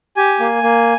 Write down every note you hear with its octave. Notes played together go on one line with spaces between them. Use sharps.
G4 G#5
A#3
A#3